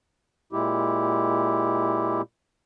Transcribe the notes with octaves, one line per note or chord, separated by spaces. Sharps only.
A#2 G#3 E4 G4